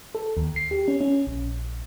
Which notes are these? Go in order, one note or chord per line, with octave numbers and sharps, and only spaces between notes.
A4
D#2
C7
G4
C#4
C#4
A#1